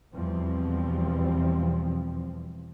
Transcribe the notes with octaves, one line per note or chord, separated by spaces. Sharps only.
E2 B2 E3 F3 G3 C4